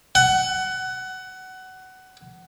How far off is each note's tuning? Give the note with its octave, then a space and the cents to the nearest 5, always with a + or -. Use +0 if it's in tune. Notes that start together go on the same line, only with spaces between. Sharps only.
F#5 +20